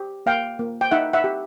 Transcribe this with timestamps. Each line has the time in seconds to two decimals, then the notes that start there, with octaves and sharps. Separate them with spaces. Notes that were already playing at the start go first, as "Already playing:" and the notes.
Already playing: G4
0.26 A#3 F5 G5
0.59 A#3
0.81 G5
0.91 D#4 E5 F#5
1.13 E5 F#5
1.24 G4